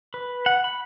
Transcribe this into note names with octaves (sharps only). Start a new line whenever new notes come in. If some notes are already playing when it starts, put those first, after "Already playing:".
B4
F#5
B5